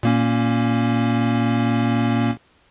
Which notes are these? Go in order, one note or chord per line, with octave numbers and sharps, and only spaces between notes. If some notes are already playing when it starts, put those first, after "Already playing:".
A#2 A#3 C#4